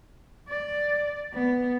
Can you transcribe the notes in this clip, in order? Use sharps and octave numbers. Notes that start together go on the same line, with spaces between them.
D5
B3